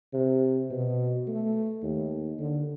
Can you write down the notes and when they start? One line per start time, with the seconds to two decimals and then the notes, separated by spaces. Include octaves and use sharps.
0.13 C3
0.71 B2
1.27 A3
1.83 D#2
2.39 D3